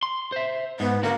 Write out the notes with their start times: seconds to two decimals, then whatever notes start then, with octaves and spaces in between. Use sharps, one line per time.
0.03 C6
0.32 C5 E5
0.80 G#2 B3
1.03 D3 A#3 F#4